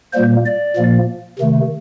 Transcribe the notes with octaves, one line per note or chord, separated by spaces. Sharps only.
A#2 G3 A#3 C5
D5
A#2 F3 A#3
C3 D#3 A3